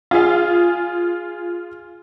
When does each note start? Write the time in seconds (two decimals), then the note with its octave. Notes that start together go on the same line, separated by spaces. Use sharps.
0.11 F4 G#4 F5